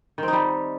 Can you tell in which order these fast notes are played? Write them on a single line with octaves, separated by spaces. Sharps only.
D#3 C4 D#4 G3